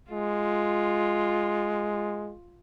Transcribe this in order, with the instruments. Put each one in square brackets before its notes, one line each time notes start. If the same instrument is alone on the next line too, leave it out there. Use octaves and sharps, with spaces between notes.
[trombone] G#3 [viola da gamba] F4